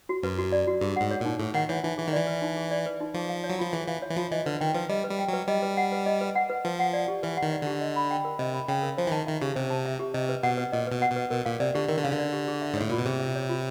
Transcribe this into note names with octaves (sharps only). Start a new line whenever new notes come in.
F#4
F#2 B4
F#4
D5
F#4
G2 G#4
G#2 F#5
C#5
A#2 D#4
A2 G#4
D#3 F#5
E3 C#5
E3 D#4
E3 G#4
D#3
E3 D5
B4
D#4
G#4
D5
B4
D#4
F3 G#4
F5
C#5
F#3
F3 F4
E3 G#4
E3 F5
C#5
E3
F3 F4
E3 D#5
D3 B4
D#3 G5
F3 B4
G3 D#5
B4
G3
G5
F#3 B4
G3 D#5
B4
F#5
B4
D#5
B4
F#5
B4
F3 B4
F#5
D5
G4
E3 B4
F#5
D#3
D5
D3 G4
D#5
B5
G5
A#4
C3 D#5
B5
C#3 G5
A#4
F3 C5
E3
D#3 A5
D#3 E5
C#3 G4
C3 C5
A5
E5
G4
C3 D#5
B4
B2 F#5
B4
A#2 D#5
B2 B4
F#5
B2
B4
B2 A#4
A#2 F5
C3 D5
D3 G4
D#3 A#4
D3
C#3 F5
D3
D5
G4
G#4
E5
G#2
A2 C#5
A#2 F4
B2
C3 G#4
E5
C#5
F4